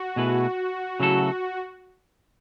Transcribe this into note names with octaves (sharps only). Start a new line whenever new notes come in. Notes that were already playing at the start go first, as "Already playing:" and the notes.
Already playing: F#4
B2 A3 E4 G#4 B4
C#3 F#3 A3 E4 A4